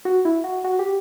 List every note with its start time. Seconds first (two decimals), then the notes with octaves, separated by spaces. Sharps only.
0.05 F#4
0.25 E4
0.44 F#4
0.64 F#4
0.79 G4